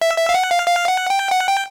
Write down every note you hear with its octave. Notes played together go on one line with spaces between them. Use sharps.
E5
E5
F5
F#5
F5
F5
F#5
G5
F#5
G5